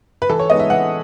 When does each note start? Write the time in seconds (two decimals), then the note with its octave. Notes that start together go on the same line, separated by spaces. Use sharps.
0.22 B4
0.30 E3 A4
0.40 C#5
0.50 G#3 B3 D#4 D#5
0.60 E5
0.70 E3 F#5